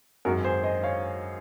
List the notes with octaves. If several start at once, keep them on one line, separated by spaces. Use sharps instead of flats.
G#1 F#2 D#3 G#3 F#4 A#4
G#4 C5
C5 D#5
C#5 F5